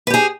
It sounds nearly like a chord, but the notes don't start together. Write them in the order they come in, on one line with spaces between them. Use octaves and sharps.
B4 G4 G#4